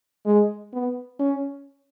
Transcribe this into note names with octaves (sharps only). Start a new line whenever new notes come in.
G#3
B3
C#4